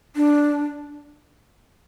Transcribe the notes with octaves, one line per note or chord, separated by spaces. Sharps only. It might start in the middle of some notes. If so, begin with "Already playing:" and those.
D4